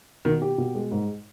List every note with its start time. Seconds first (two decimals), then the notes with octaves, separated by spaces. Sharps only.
0.25 B2 D#3
0.42 G4
0.58 B2
0.75 G#3
0.91 G#2